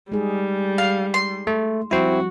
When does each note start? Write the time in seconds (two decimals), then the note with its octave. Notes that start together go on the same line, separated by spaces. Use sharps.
0.12 G3 G#3 D#4 G#4
0.78 F5
1.14 C6
1.47 A3
1.91 F3 G3 C4 E4 F#4